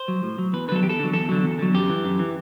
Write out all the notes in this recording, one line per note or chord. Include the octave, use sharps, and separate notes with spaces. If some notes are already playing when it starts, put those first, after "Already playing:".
Already playing: C5
F#3
A2
F#3
E2 B4
D3 F#3 A4 B4
E2 G4
A4
D3 F#3
E2 A4
D3 F#3
E2
D3 F#3
F#2 G4
E3
F#2
E3